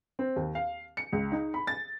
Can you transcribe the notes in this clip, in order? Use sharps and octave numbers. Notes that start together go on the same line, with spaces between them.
C4
D#2
F5
C#7
C#2
D#4
B5
A6